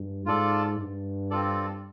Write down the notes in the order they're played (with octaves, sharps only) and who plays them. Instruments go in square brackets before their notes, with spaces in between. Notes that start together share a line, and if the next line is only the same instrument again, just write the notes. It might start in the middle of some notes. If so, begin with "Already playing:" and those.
Already playing: [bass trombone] G2
[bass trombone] G#2 [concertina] F4 A4 D5
[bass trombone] G2
[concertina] C4 F4 A4 D5